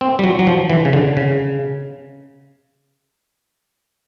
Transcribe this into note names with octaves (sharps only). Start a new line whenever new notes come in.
C4
G3
F#3
F#3
F3
E3
C#3
D3
C#3